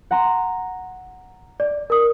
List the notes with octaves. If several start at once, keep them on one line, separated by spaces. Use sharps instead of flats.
F#5 A#5 C6
D5
A#4 D#6